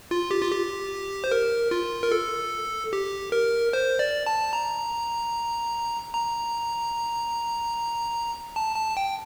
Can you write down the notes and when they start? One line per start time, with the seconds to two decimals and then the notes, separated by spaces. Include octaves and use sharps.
0.11 F4
0.31 G4
0.41 F4
0.51 G4
1.24 C5
1.31 A#4
1.71 F4
2.03 A#4
2.12 A4
2.93 G4
3.32 A#4
3.73 C5
3.99 D5
4.26 A5
4.53 A#5
6.14 A#5
8.56 A5
8.76 A5
8.97 G5